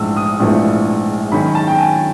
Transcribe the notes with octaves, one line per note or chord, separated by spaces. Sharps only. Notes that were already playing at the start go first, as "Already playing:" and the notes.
Already playing: A#1 G#2 E3 A3 E6
D#6
A#1 G#2 E3 A3
F#2 D#3 G#3 C#4 B5
A5
G5
G#5